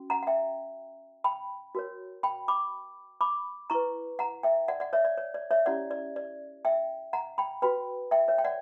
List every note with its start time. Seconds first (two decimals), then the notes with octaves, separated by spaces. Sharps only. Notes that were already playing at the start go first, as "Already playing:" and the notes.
Already playing: C#4 F#4
0.10 F#5 A#5
0.23 F#5
0.27 E5 G5
1.24 G5 B5
1.75 F#4 A#4 C#5
2.23 G5 B5
2.48 B5 D6
3.21 B5 D6
3.70 E4 B4 A#5 C#6
4.19 F#5 A#5
4.43 E5 G5
4.68 D5 F#5
4.80 D5 F#5
4.93 C#5 E5
5.05 D5
5.17 C#5
5.34 D5
5.51 C#5 E5
5.66 C#4 E4 G4 D5 F#5
5.91 D5
6.16 D5
6.65 E5 G5
7.13 F#5 A#5
7.38 G5 B5
7.62 F#4 B4 G5 B5
8.11 E5 G5
8.28 C#5 E5
8.38 G5
8.44 D5 F#5